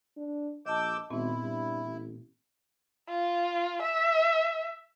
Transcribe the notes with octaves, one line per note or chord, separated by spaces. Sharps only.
D4
A#1 D#5 A5 D6 E6 G6
G#1 A#2 B3 C4 E4
G2
A1
F4
E5